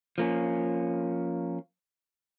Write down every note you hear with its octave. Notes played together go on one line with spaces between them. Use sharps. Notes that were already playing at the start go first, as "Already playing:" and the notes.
F3 A#3 C#4